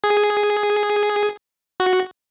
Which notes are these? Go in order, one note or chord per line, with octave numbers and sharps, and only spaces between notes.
G#4
F#4